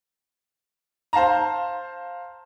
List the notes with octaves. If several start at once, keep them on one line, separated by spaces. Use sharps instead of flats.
C5 F5 A5 A#5